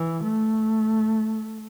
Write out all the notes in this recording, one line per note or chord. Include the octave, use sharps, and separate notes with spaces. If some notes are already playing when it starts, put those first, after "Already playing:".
Already playing: E3
A3